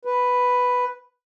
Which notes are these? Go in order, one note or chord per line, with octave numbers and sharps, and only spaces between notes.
B4